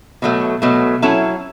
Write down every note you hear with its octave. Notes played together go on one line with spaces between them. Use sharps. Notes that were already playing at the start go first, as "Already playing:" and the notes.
B2 F#3 A3
B2 F#3 A3
F#3 C#4 E4 A4